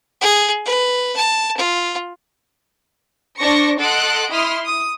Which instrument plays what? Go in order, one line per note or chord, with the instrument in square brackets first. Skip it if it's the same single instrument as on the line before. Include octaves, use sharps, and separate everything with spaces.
[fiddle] G#4
B4
A5
F4
[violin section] D4 C5 C#6 A#6 C#7
A4 D#5 F#5 C6 F#6 D7
E4 C6 D#6 F6
D#6